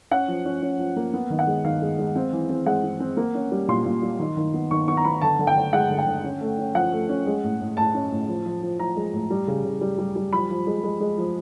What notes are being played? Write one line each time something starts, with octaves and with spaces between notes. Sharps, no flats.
C#4 F#5
F3
C#4
C#4
F3
A#3
B3
D#3
F#5
G#3
D#3 F5
G#3
G#3
C4
E3
C4
G#3 F#5
C4
C4
A#3
C#4
G3
A#2 C6
A#2
G3
D#3
D#3
B3
D#3 C#6
B3 C#6
A#5
B3 B5
D3 A5
D3
G5
D3
G#3 F#5
D3
G5
D3
C#4
A3
C#4
F3 F#5
A3
C#4
G#3
A2
A2
A2 A5
C#4
A2
F3
F3
F3
F3 A#5
G#3
A2
G3
C#3
C#3
G3
G3
G3
F3 B5
F3
G#3
G#3
G#3
F3